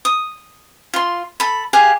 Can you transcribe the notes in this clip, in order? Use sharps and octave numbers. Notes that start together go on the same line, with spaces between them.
D#6
F4 C6
A4 B5
G4 G#4 F5 F#5